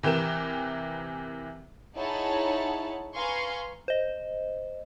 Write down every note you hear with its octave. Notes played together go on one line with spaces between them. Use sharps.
C3 E3 G4 A#4 E7
D#4 E4 G#4 C#5 F#5 A5
B4 F5 G#5 A#5 C6 C#6
C5 D#5